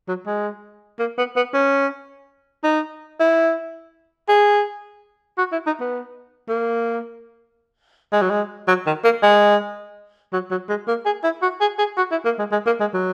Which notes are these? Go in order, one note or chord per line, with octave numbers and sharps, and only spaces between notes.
F#3
G#3
A#3
B3
B3
C#4
D#4
E4
G#4
F#4
E4
D#4
B3
A#3
G#3
F#3
G#3
F#3
D#3
A#3
G#3
F#3
F#3
G#3
A#3
G#4
E4
F#4
G#4
G#4
F#4
E4
A#3
G#3
G#3
A#3
G#3
F#3